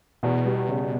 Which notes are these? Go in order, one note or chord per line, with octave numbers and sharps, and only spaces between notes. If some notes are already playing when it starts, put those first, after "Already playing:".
E2 B2
G3
C#3